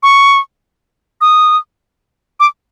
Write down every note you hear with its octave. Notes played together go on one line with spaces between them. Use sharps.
C#6
D#6
D6